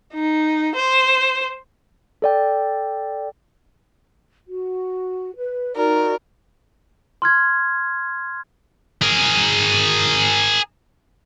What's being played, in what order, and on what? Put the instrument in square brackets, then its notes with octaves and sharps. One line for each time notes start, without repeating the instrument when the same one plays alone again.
[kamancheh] D#4
C5
[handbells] A4 D5 G5
[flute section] F#4
B4
[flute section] D#4 F#4 D5 [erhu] A#4
[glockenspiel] C6 F6 G#6
[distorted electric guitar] G#4 A#4